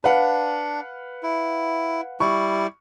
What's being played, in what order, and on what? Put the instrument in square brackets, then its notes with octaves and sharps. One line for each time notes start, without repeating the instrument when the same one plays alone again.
[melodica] D4 [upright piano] B4 F5 F#5
[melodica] E4
[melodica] G3 E4 [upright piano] C#6